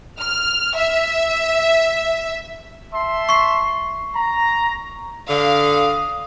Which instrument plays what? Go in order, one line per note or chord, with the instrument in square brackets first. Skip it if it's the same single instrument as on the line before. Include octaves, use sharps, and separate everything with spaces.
[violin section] F6
E5
[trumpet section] E5 A5 C6
[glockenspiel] C#6 C7
[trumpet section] A#5
[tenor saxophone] D3 [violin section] F5 [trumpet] D#6